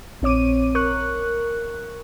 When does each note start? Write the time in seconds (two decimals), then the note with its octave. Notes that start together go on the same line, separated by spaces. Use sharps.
0.22 A#1 C4 C#5 D6 D#7
0.75 A#4 C#6 F#6